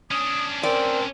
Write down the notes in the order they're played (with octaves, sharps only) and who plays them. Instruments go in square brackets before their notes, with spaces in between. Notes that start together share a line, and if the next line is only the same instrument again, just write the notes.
[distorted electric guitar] C#4 D4 [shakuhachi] D#6
[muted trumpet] C4 [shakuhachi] A#4 [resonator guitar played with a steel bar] D5